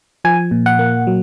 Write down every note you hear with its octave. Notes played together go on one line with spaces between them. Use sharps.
F3 G#5
A#2
F#5
A#3
F#3